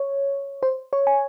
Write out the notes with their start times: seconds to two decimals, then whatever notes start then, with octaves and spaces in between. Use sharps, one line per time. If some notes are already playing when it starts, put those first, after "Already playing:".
Already playing: C#5
0.63 C5
0.93 C#5
1.07 G#5